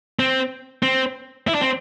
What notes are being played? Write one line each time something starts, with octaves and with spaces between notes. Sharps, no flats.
C4
C4
E4
D4
C4